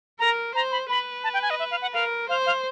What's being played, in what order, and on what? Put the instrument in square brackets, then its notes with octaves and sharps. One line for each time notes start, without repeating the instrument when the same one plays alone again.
[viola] A#4 [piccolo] A#5
[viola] C5 [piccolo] A#5
[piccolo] B5
[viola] B4 [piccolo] B5
[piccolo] A5
G5
G#5
D#5
E5
F5
F#5
[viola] A#4 [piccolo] F5
[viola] C5 [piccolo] F5
[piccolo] F5